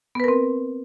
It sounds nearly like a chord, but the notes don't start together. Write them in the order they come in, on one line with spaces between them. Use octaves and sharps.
B3 B4 A#4 C4